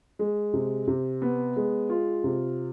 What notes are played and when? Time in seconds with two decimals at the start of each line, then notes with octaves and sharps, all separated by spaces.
0.19 G#3
0.54 C3
0.88 C3
1.22 B3
1.56 G#3
1.90 F4
2.24 C3